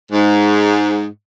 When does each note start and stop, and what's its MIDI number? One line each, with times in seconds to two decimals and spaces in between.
0.12 1.05 44